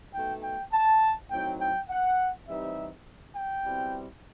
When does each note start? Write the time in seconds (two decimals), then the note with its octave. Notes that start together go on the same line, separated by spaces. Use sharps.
0.13 B2 A3 D#4 G5
0.43 G5
0.72 A5
1.30 A2 F#3 C4 D#4 G5
1.60 G5
1.89 F#5
2.48 C3 E3 G3 C4 D#4 E5
3.36 G5
3.65 B2 G3 C4 E4